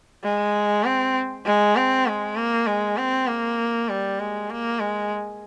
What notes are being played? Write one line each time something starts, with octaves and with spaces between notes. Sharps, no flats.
G#3
C4
G#3
C4
G#3
A#3
G#3
C4
A#3
G3
G#3
A#3
G#3